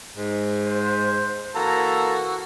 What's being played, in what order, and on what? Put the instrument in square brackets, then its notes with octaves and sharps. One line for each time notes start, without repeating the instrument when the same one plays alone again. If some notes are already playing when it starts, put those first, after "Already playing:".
[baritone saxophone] G#2
[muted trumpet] C5
[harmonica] E3 A#3 A#5 [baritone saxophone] F#4 [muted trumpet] A4